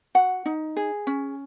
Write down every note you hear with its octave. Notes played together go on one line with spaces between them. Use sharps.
F#4 F#5
D#4
G#4
C#4